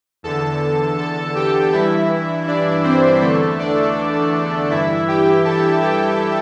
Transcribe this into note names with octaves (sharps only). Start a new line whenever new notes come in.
E2 D3 A4 A5
A4 A5
G4 G5
G2 E3 E4 E5
D4 D5
C4 C5
E2 D3 A3 A4
D4 D5
G2 E3 E4 E5
G4 G5
A4 A5
G4 G5